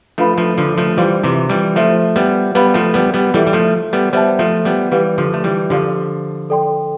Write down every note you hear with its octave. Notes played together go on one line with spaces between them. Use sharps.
F3 A3 D4 F4 B4 F5 B5
F3 A3
D3 F3
F3 A3
E3 G3 F4 C5 F5 C6
C3 E3
E3 G3
F3 A3 F4 C5 E5
G3 B3
G3 B3 B4 F5 B5
F3 A3
G3 B3
G3 B3
E3 G3 E4 A4 E5
G3
F3 A3
G3 B3
G3 B3 C5 E5 A5
F3 A3
G3 B3
E3 G3 G4 B4 F5
D3 F3
A3
E3 G3
D3 F3 G4 D5 F5
A4 D5 G5 C6